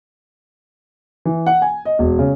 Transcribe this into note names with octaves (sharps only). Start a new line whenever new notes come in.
E3
F#5
G#5
D#5
E1
C#3